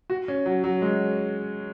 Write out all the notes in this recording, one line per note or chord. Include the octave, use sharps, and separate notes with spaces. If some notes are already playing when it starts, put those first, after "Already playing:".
F#4
C#4
F#3
F#3
G#3